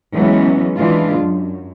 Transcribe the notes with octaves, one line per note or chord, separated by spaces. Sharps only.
E3 F#3 G#3 B3 C#4
E3 G#3 D4 F4
F#2